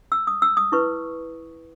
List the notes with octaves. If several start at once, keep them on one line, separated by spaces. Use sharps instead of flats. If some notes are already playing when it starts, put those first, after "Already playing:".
E6
D#6
E6
D#6
E4 B4 C#6